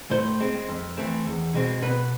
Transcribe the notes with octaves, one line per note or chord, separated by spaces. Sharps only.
A2 C5
G#3 C4
F2
E3 A3 C4
E2
B2 G#3 C4
B2 B4